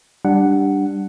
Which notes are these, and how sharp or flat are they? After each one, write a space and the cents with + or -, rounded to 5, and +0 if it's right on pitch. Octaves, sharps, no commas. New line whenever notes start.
G3 +0 D4 +0 F#5 +0